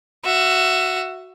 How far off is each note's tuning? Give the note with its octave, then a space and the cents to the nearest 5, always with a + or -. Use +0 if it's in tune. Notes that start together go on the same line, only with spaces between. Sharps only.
F#4 +0 E5 +20